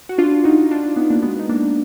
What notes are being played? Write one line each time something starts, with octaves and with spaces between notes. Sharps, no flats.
F#4
D4 F4
D#4 F#4
D4 F4
D4 F4
B3 D#4
A#3 D4
G#3 B3
D#4
A#3 D4